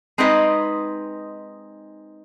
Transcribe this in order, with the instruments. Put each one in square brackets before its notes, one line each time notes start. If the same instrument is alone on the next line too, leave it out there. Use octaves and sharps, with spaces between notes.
[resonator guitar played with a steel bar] G#3 C4 D#4 B4 D#5